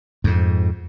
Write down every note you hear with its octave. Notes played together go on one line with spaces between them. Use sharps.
F2 G#2